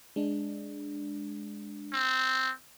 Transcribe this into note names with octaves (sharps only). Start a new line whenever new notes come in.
G#3 D4
C4